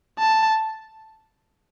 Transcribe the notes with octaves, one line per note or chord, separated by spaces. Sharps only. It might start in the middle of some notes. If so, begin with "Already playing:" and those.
A5